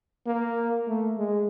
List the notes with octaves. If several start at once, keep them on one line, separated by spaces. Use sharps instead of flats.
A#3
A3
G#3